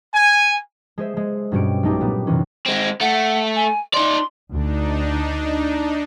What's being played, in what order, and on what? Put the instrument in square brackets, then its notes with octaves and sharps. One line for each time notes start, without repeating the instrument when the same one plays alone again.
[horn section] G#5
[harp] G#3 G#4 C5 E5
G#3
G2 B2 G3 C#4 F#4 D7
B1 A3 D#4 G4 D6
A#2 G3 B3
F#2 C3 E3 C#4
[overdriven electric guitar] G#3 C4
[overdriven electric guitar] A3 [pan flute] F#5
[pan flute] G#5
[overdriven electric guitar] D#4 D5 [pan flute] C6
[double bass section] D2 [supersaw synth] D4 D#4